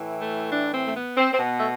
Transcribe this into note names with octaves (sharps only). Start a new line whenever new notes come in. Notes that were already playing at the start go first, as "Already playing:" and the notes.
Already playing: A2 E3
A3
D4
C4
A3
B3
C4
C4
B2 B3
A3